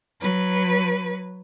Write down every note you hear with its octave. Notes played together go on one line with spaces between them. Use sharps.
F#3 B4